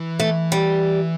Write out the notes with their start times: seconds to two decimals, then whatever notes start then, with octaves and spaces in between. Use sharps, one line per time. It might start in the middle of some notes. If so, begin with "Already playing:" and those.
Already playing: E3
0.20 A3
0.52 G3